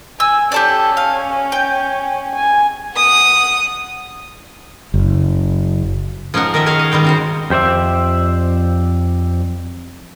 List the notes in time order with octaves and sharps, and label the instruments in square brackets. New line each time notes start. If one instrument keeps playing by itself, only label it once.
[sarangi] G#5 [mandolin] E6
[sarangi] C#4 [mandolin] G4 A4 D5
[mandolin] F5
G5
[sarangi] G#5
[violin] F#5 D#6
[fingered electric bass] F#1
[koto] F3 C#4 D#4 A#4 F#5
D#3 A#4 D#5 E5
F#4 G#4 A#4 C#5 D#5 F5
D#5
D#3 G3 G#3 G5
C#3 F#4 C5
[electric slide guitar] F2 G4 C5 D5 E5